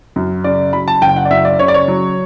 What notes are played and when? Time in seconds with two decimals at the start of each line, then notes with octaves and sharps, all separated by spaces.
0.16 F#2
0.44 C#3 D5
0.73 F#3 B5
0.88 A5
1.02 F#1 G5
1.16 F#5
1.25 D5
1.30 F#2 E5
1.45 D5
1.59 C#3 C#5
1.68 D5
1.74 C#5
1.88 F#3